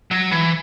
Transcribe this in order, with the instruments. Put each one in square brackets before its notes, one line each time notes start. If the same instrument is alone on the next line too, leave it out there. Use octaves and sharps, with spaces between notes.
[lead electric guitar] F#3
E3